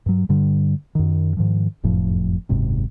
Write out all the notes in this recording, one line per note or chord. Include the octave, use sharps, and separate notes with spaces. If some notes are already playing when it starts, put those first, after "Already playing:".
G2 F#3
G2 D3 G3
F#2 D#3
G#2 D#3 F3
F#1 F2 A2 F3
F#1 D#2 G#2 C3